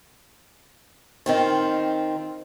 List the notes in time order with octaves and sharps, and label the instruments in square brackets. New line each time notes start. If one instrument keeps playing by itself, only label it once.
[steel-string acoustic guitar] D#3 C4 F4